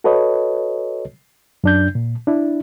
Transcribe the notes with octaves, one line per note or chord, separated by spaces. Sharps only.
F#4 A4 B4 C#5 D#5
F#2 D4 G6
A#2
D4 E4